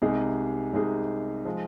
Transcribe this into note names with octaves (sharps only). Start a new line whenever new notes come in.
C2 C3 G#3 D#4 G#4
C2 C3 G#3 D#4 G#4
F3 G#3